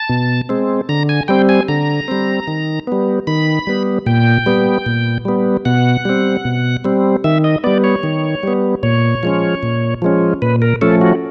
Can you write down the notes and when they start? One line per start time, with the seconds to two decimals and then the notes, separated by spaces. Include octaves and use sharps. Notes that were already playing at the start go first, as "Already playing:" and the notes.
Already playing: A5
0.09 B2
0.49 G#3 C4
0.89 D3 A#5
1.09 G#5
1.28 G3 C4 G5
1.49 G#5
1.68 D3 A#5
2.08 G3 C4
2.48 D#3
2.87 G3 B3
3.27 D#3 B5
3.67 G3 B3
4.06 A#2 G5
4.46 G3 B3
4.86 A#2
5.25 G3 B3
5.65 B2 F#5
6.05 G3 C4
6.45 B2
6.85 G3 C4
7.24 D#3 E5
7.44 D#5
7.64 G3 B3 D5
7.84 C#5
8.03 D#3
8.43 G3 B3
8.83 A#2 C#5
9.23 F3 G#3 C#4
9.63 A#2
10.02 F3 G#3 C#4
10.42 A#2 B4
10.62 A#4
10.81 F3 A3 C#4 A4
11.01 F#4